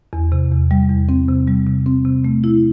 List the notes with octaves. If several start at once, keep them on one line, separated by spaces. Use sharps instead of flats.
E2
C3
E2
G3
E2
C4
C3
G3
C3
C4
C3
A3
E4